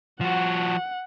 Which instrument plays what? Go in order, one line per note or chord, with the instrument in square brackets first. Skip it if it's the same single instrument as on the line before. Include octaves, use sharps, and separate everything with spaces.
[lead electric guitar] F3 F#4 [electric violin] F#5